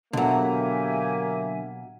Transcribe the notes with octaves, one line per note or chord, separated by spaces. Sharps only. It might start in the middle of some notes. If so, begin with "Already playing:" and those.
B2 D3 F#3 A#3 G4 E5 F#5 G#5